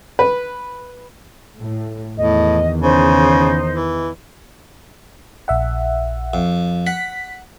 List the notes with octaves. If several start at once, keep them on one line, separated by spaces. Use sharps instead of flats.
B4
A2
E2 A2 D#3 D#5
C#3 D#4 C5
E3
A#1 E5 F#5
F2
F#5 B6